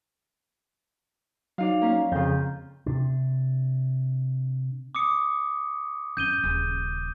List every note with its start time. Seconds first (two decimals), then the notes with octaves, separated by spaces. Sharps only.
1.58 F#3 D#4 D5 F5
1.82 A#3 C#4
2.12 F2 C#3 F4 G6
2.86 C3 D4
4.95 D6 D#6 C#7
6.17 F#2 C4 G6 D#7 G7
6.44 D#1 C#3